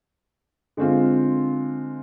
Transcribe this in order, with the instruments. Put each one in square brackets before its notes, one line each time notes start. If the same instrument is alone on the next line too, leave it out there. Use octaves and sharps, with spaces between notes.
[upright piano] D3 G#3 C4 F4